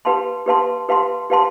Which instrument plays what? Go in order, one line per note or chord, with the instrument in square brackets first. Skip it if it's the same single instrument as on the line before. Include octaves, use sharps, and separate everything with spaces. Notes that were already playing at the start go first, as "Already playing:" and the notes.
[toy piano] G4 B4 F5 A5 C6
G4 B4 F5 A5 C6
G4 B4 F5 A5 C6
G4 B4 F5 A5 C6